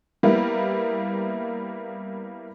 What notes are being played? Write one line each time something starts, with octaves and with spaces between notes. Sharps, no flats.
G3 A#3 B3 E4